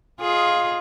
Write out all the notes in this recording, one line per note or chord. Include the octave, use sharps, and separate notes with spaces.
F4 G#4 D#5